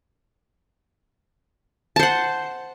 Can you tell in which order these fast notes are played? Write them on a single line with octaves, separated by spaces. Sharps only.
A5 C5 F#5